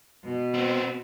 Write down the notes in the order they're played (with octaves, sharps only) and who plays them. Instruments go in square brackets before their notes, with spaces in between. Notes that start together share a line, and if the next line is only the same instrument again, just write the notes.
[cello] B2
[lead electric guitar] B3 C4